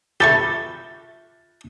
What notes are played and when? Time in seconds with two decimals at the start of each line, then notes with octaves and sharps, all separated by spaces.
0.20 F4 G4 A4 E5 C#6 A6